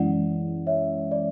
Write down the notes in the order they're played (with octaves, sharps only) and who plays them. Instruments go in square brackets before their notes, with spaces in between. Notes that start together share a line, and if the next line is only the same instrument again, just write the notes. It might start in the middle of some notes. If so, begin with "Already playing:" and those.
Already playing: [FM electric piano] F#2 E3 G#3 C#4 E4 [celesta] D5 F#5
[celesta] C#5 E5
D5